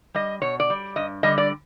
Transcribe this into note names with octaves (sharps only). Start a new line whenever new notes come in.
G3 D#5
B2 C#5
D5
G3
G2 D#5
D3 G3 D#5
D5